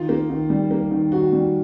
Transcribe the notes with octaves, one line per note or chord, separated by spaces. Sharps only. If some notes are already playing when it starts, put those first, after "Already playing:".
Already playing: D#3 F4
A#3
D#3
G3
A#3
D#3
D#3 F#4
G3